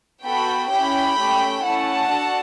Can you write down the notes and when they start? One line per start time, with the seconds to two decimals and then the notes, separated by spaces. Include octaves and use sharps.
0.24 B3 F#4 A4 G5 B5
0.70 C#4 E4 G4 G5 B5
1.17 A3 C#4 G4
1.64 A3 C#4 E4 F#5 A5
2.11 D4 F#4 A4